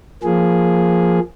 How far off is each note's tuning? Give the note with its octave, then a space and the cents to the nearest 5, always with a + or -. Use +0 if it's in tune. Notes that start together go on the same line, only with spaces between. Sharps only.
F3 +0 A#3 +0 G#4 +0